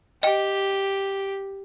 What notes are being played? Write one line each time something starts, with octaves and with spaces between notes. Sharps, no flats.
G4 D#5 G5